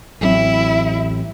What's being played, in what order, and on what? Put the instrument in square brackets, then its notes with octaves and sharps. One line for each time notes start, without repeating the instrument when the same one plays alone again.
[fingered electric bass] A1 F#3 C4 [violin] E4